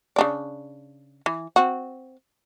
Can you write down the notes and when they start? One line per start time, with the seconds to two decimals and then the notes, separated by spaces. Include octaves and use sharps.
0.16 C#3 D4 D5
1.26 E3
1.56 C4 F#4